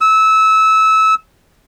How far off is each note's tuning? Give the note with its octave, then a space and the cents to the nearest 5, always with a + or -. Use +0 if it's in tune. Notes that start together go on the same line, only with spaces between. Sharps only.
E6 -20